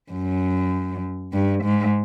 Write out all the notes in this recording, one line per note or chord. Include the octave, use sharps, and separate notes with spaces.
F#2
G2
G#2